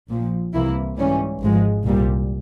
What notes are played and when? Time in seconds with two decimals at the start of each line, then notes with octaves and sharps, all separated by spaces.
0.09 A#1 A#2 F3
0.53 C2 C3 E3 A#3 E4
0.97 G#2 E3 G3 C#4
1.41 G#1 G#2 F3 G#3
1.84 C2 A#2 G3